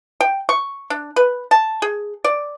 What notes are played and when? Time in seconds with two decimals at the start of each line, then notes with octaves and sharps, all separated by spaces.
0.21 G5
0.49 C#6
0.90 D4
1.16 B4
1.51 A5
1.82 G#4
2.24 D5